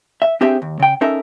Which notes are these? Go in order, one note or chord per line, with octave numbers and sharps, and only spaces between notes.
E5
C4 D4 G4 G#4 C5 E5
D#2
C#3 G5
C#4 D#4 A4 A#4 E5